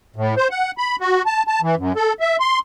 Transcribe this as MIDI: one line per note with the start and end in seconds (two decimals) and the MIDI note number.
0.16 0.35 45
0.37 0.48 72
0.51 0.71 78
0.78 0.96 83
1.01 1.22 66
1.26 1.43 81
1.47 1.60 81
1.62 1.75 52
1.78 1.92 42
1.96 2.13 69
2.20 2.37 76
2.40 2.59 84